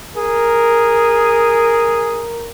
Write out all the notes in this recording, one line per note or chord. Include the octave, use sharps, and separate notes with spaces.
G#4 A#4